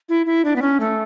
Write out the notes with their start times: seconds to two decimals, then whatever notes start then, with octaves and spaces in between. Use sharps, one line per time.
0.09 E4
0.26 E4
0.45 D4
0.56 B3
0.62 C#4
0.80 A3